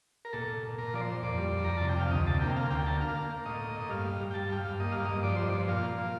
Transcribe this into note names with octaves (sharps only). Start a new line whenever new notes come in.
A#4
A#2 A4
A#2
A#2
A#2 A#4
F3 D5
C5
A#2
F2 D5
G3
F2
F2 A#5
C3 A5
G5
F2 F5
D2 D#5
C3 A5
A#3 G5
A#3 F5
D2 G5
G5
A#3 A5
A#3 F5
A#3
A#3
A2 D#5
A#3
A2
D#5
G2 F5
G3
G2
G5
G3 A5
G2 G5
F5
G2
A#3 D#5
G2 F5
G2 D#5
F3 D5
G2 C5
D5
F3
A#2 F5
A#3
F3